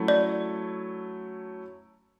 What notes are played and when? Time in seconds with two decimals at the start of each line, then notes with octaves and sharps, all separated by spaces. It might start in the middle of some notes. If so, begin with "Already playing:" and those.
Already playing: F#3 A3 C#4 E4 A4
0.08 D5